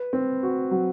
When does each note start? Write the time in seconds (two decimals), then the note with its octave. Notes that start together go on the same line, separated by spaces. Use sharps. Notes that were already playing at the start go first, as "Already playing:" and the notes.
Already playing: B4
0.13 C4
0.43 F#4
0.71 F#3